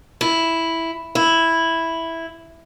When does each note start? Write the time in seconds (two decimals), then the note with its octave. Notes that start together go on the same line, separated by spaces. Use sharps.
0.21 E4
1.15 E4